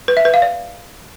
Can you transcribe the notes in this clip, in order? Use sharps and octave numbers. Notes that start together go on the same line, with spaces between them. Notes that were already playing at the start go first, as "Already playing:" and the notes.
B4
E5
B4
F5
D5